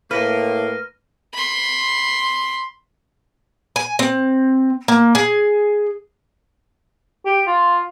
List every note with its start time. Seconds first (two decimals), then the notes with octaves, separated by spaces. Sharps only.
0.11 A2 A#3 B4 F6 A#6 D#7
1.33 B5 C6
3.76 G#5
3.99 C4
4.88 A#3
5.15 G#4
7.26 G4
7.47 F4